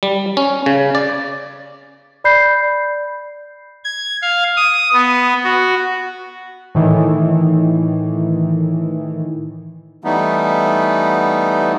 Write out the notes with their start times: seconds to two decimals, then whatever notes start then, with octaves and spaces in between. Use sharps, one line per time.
0.03 G3
0.37 C#4
0.66 C#3
0.95 D5
2.24 D5 B5 G6 C7
3.84 G#6
4.22 F5
4.57 D#6
4.93 B3
5.44 F#4
6.75 A2 D#3 E3
10.04 E3 G3 A3 B3 D#4